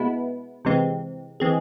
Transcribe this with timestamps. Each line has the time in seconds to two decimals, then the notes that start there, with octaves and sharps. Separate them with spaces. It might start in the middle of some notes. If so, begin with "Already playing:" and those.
Already playing: B2 G#3 B3 E4
0.65 C3 E3 G#3 C4
1.40 E3 G#3 C4 G#4